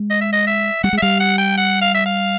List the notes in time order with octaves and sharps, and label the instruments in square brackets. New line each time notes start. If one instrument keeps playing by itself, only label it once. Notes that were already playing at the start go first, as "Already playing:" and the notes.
Already playing: [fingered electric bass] G#3
[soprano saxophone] D#5
E5
D#5
E5
[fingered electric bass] G3 [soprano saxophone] F#5
[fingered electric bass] G#3
[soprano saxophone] E5
[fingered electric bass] G3 [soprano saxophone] F5
[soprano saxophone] F#5
G5
F#5
F5
E5
F5